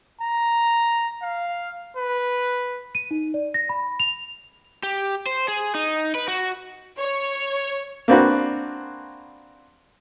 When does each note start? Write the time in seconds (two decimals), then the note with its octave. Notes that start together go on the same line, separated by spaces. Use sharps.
0.22 A#5
1.22 F5
1.97 B4
2.95 D#7
3.11 D#4
3.34 D5
3.54 A#6
3.69 B5
4.00 F7
4.83 G4
5.26 C5
5.48 G#4
5.75 D#4
6.15 B4
6.28 F#4
6.98 C#5
8.08 A#3 C4 D4 F#4 B4